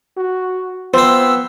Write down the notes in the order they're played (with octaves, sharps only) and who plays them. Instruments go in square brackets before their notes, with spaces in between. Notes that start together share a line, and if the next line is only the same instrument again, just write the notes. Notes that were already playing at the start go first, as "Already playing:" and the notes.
[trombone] F#4
[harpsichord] F3 C4 [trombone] B3 [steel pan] C5 [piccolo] E6